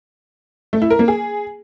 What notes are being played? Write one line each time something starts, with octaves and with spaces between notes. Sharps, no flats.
A3
E4
A#4
A#3
G#4